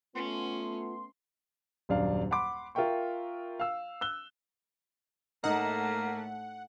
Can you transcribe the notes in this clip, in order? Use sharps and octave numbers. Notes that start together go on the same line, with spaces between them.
A3 B3 C#4 F4 C6
D#1 F#2 D4 F5
F#5 B5 C6 D6
F4 A#4 E5 G5 C#6
F5 E6
E6 F#6 G7
A2 A3 A#3 D#4 D#5 F#5